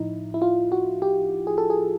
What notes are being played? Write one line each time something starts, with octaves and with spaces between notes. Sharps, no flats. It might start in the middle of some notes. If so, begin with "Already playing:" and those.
Already playing: A2 F3 D#4 E4
E4
F4
F#4
G4
G#4
A4
G#4